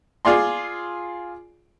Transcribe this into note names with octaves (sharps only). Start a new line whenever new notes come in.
F4 G#4 D5 C6